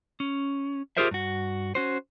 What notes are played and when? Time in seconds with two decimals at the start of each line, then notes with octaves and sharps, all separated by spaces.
0.20 C#4
0.97 F4 G4 G#4 A#4 C5 E5
1.11 G2 F#4
1.75 C#4 F#4 C5